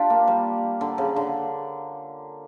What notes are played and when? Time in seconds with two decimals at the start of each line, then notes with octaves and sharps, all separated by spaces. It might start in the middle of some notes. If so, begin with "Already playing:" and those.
Already playing: D4 F4 G4
0.10 A#3
0.27 G3
0.81 D3
0.98 C#3
1.16 D3